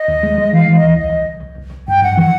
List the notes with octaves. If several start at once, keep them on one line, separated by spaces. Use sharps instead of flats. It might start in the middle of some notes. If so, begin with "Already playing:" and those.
Already playing: D#5
D#2
G#3
G#3
E3 F5
E3
D#5
D#2
C2 D#5
C2
C2
C2
C2
C2
G2 G5
G2 F#5
E3 F#5